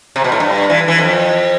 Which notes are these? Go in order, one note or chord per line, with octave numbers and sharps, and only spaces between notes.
C3
B2
A2
G2
E3
E3
F2